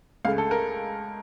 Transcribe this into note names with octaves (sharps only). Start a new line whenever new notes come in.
C#2 C#3 A3 F5
A4
A#4